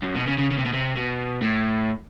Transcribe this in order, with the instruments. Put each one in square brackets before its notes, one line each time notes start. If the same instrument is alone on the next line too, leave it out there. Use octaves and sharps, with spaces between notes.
[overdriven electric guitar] F#2
B2
C#3
C#3
C#3
C3
B2
C3
B2
A2